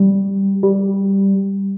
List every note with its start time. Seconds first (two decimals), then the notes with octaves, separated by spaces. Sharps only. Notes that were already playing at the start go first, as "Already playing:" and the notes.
Already playing: G3
0.63 G3